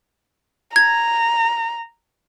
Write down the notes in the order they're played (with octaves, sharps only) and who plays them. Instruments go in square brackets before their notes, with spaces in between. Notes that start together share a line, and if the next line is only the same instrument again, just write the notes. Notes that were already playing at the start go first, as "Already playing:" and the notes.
[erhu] A#5 [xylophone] G#6